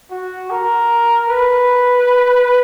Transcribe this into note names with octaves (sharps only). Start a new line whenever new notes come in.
F#4
A#4
B4